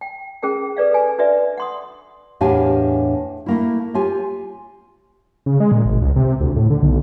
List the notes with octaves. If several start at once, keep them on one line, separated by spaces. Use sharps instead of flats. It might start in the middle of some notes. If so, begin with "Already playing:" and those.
G5
C#4 G#4 A#4 G5
A4 B4 D5 F5
A4 B4 G#5
D4 F#4 B4 D5 E5
F#5 C6 D#6
E2 A2 D4 G4 F5 G#5
A3 A#3 E4
F4 G4 G#5
C#3
G#3
A#2
G#1
C#2
C3
D2
A2
D3
B1